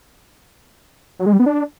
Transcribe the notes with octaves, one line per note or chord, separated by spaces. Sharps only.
F#3
G#3
G3
B3
D4